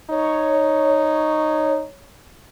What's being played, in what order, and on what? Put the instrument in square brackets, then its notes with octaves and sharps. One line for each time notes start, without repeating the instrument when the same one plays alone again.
[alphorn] D#4 [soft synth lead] C#5